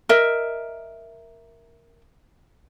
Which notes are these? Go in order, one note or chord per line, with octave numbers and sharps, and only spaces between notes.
A#4 D#5 E5